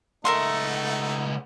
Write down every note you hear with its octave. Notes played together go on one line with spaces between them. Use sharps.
C#2 A3 D#4 A#4 E5 F#5 C6